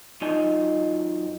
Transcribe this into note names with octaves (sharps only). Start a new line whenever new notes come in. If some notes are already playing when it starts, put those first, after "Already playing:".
F#2 D#4 F4 D#5 G#5 A5